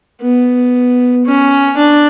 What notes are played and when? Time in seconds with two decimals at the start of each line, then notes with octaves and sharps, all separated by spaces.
0.21 B3
1.25 C#4
1.77 D4